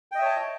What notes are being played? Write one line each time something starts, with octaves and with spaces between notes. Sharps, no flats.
C#5 D#5 E5 G5 A5